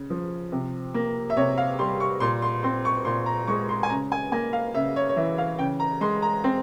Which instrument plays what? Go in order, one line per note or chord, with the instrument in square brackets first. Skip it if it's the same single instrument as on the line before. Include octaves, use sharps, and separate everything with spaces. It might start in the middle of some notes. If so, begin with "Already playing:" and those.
Already playing: [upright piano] C#3
F3
C3
A#3
E5
C3 C#5
F5
G3 C6
C#6
A#2 C6
C6
C4 C6
C#6
A#2 C6
A#5
G#3 C#6
C6
G#5
C#3 A#5
G#5
A#3 G#5
F5
C#3 E5
C#5
C#5
E3 E5
F5
C#3 G5
A#5
G#3 C6
A#5
C4